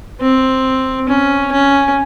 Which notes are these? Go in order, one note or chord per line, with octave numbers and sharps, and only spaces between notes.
C4
C#4
C#4